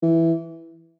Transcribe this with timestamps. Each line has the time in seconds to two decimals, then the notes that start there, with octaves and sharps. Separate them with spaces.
0.03 E3